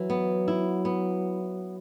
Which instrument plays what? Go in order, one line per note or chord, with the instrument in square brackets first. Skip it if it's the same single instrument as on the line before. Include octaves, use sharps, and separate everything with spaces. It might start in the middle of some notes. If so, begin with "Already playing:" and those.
Already playing: [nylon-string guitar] E3 [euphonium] F#3
[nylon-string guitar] B3
E4
B3